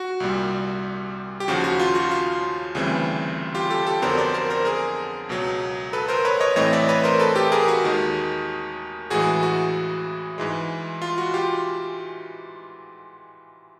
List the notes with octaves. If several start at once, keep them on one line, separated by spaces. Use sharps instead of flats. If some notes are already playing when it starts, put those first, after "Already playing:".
Already playing: F#4
C2 A#2 G3
G4
D#2 C#3 F3 F#4
F#4
F4
F#4
F4
D2 C#3 E3 G3 C4
F4 G4
G4 A4
G4 A4
F2 D3 F#3 B3 D4 A#4 C5
C5 D5
A#4 C5
A#4 C5
G#4 A#4
C#2 B2 F#3
A4 B4
A#4 C5
B4 C#5
C#5 D#5
A2 E3 A3 C4 C#5 D#5
D5 E5
B4 C#5
A#4 C5
A4 B4
G4 A4
G#4 A#4
F#4 G#4
D#2 D#3 G#3
A1 A2 E3 G#3 F#4 G#4
F#4
G#2 E3 G#3
F4
F#4
F4 G4